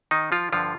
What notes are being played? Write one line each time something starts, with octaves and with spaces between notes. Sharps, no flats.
D#3 D#4
F3 F4
G2 D3 F3 F4